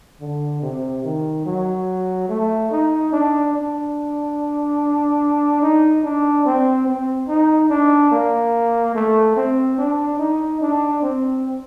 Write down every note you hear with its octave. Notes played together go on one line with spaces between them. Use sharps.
D3
C3
D#3
F#3
A3
D#4
D4
D4
D#4
D4
C4
C4
D#4
D4
A#3
A3
C4
D4
D#4
D4
C4